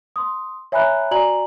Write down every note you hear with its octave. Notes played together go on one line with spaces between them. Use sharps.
C6 D#6
C#5 E5 G#5 A#5 B5 F#6
F#4 D5 G#5 A#5 F#7